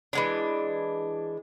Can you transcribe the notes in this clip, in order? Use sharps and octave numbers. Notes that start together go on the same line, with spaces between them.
E3 G#3 D4